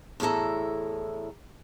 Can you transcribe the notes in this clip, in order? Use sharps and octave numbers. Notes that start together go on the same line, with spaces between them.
E2 A2 E4 A4 A#5